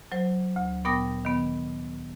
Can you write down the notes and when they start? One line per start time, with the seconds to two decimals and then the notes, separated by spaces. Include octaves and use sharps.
0.12 F#3 C5
0.56 D2
0.85 A#2 B3 G5 D#6 A#6
1.25 D#3 B3